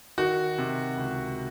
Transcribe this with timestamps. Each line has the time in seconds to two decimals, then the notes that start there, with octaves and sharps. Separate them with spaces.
0.18 D#3 F#4
0.58 C3
0.97 C#2